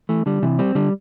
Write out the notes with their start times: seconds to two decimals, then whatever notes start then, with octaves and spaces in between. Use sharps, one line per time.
0.09 E3 A3
0.26 D3 G3
0.42 C3 E3
0.59 G3 C4
0.75 D3 G3